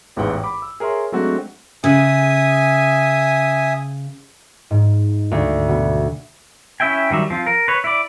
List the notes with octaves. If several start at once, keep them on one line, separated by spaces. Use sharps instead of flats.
A1 E2 G#2 E3 F#5 G5
B5 D6
E6
G#4 A#4 C#5 E5 C6
F#3 G#3 A3 C4 D4 F#4
C#3 E5 G#5 D#6
G#2
D2
B2
C#4 E4 E5 G5 G#5
D#3 F#3 G3 E5
F3 C4 F4
A#4
B4 C#5
E4 D5